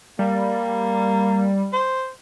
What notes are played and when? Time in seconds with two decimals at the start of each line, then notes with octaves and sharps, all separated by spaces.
0.19 G3 A#3
1.73 C5